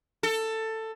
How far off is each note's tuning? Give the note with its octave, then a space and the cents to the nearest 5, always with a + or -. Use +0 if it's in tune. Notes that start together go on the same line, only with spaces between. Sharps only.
A4 +15